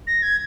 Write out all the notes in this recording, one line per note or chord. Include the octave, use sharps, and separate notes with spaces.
A#6
G#6